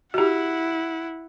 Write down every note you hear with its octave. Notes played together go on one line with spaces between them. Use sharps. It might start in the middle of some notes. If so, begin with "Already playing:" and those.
E4 F#4 G4 F#5